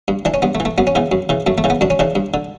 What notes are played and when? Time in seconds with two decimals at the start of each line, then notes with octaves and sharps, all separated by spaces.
0.08 G2
0.25 E3 D4
0.34 C#4
0.42 G2 B3
0.55 A3
0.60 E3
0.65 A3
0.78 F#2 B3
0.87 C#4
0.95 C#3 E3 B3
1.12 F#2
1.29 C#3 E3
1.47 F#2 A3
1.58 A3
1.64 C#3 E3
1.70 B3
1.81 F#2 D4
1.90 C#4
1.99 C#3 E3 D4
2.15 G2
2.34 D3